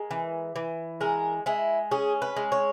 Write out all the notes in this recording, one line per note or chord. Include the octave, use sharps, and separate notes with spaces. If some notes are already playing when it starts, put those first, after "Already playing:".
Already playing: G#3 A#4
E3
E3
G#3 A#4
G#3 E4
C#4 G#4
B4
G#3
C#5